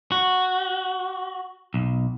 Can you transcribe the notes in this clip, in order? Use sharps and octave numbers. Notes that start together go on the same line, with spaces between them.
F#4
B1